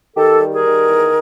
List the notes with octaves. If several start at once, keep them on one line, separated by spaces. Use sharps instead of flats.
D#3 G4 A4
G3
G#4 A#4
D#3
E2